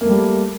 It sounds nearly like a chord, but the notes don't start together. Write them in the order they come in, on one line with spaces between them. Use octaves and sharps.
A#3 A3 G3